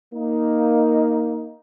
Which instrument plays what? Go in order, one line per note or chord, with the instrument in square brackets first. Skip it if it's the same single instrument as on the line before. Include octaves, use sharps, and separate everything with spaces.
[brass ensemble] A#3 D#4